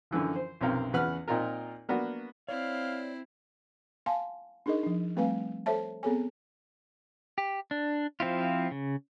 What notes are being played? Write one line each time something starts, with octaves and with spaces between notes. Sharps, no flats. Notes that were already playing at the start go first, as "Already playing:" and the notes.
F#2 D3 E3 F3
C5
B1 F#2 C3 C4 A#4 F5
E2 C#3 B4 F#5 F6
A#2 C4 D#4 F4 A#4
A#3 B3 D4 F#4
C4 E4 C#5 D5 F5
F5 G#5 A5 C6
D4 D#4 G#4 A#4 D#5
F3 D4
G3 A3 C4 B4 F5 G#5
A4 C5 C#5 E5 A5
B3 C4 G#4 A4 C#5 G#5
G4
D4
F3 C4 E4 F4
C#3